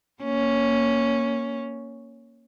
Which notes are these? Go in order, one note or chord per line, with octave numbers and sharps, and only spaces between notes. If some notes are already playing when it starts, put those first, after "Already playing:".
A#3 C#4